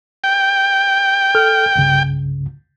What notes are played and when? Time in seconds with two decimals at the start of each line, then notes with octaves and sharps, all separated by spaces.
0.24 G5
1.35 A4 F6
1.76 C2 G2 C#3